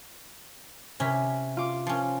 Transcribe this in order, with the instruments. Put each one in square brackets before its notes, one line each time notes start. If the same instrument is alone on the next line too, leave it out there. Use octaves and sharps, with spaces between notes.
[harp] C3 B6 [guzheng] C#4 E4
[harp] F4 D6
[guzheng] F3 C#4